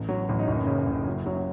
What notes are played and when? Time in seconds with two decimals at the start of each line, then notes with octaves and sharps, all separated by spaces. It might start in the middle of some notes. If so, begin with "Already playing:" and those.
Already playing: A1
0.09 F#3
0.29 A1
0.39 D#4
0.47 F#1 C#4
0.67 C#3
0.87 F#1
1.07 F#3
1.26 F#3